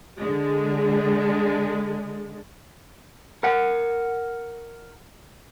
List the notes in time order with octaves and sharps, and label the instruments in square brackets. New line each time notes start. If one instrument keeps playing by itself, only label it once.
[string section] D3 G#3
[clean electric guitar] A#4 F#5